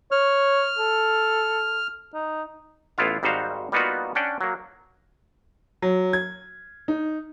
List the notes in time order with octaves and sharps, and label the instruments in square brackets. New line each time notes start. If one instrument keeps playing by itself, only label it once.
[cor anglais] C#5 [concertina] F6
[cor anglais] A4
D#4
[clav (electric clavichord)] A1 B3 E4 F4 F5
G#1 G3 D#4 F#4 C5 F5
G3 A#3 B3 D#4 F4 F#4
C#4 D4 F#5 G5
F#3 A#3
[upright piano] F#3
G#6
D#4